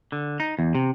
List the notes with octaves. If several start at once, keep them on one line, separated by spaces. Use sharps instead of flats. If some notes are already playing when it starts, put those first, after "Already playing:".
D3
D#4
E2
C3